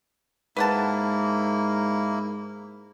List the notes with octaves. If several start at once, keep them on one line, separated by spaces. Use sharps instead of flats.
G#2 A#3 E4 B4 F#5 A5